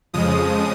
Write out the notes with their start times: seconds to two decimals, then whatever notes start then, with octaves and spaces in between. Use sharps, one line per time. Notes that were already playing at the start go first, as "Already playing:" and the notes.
0.13 F2 C#3 F3 G#3 D#6